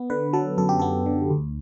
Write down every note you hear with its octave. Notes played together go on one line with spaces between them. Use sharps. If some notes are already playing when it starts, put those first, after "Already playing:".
Already playing: B3
D3 B4
F#3 A4
F#2 A4
G4
B3 A4
D3
D2